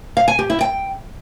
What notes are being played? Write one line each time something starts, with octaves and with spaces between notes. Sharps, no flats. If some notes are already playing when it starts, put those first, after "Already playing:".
F5
G#5
G4
E4
G5